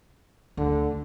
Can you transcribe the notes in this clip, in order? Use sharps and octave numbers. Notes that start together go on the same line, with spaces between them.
D2 D3